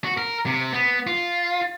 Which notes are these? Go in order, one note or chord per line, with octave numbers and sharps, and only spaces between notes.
F#4
A#4
C3
B3
F4